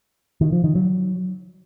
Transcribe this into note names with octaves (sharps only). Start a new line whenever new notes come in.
D#3
F3
D#3
F#3